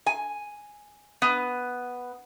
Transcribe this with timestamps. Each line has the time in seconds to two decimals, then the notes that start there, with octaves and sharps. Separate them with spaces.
0.06 G#5
1.22 B3